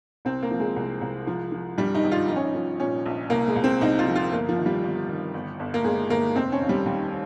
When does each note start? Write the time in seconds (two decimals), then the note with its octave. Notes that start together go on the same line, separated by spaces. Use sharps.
0.25 C2 C4
0.42 A#3
0.51 F3
0.60 G#3
0.76 C2
1.01 C2
1.27 F3
1.52 F3
1.78 G2 G3
1.95 D#4
2.04 G#1
2.12 F4
2.28 F3 D#4
2.36 C#4
2.44 D#4
2.55 F3
2.80 A#2 C#4
3.06 A#1
3.30 C2 A#3
3.48 G#3
3.56 C2
3.64 C4
3.81 C2 D#4
3.99 F4
4.07 F3
4.15 F4
4.31 G1 A#3
4.49 F3
4.58 D#3
4.66 G3
4.83 G1
5.09 D#3
5.34 G1
5.59 G1
5.74 A#3
5.84 G1 G#3
6.10 G1 A#3
6.35 F1 C4
6.52 C#4
6.61 D#2
6.69 G3
6.86 D#2 G3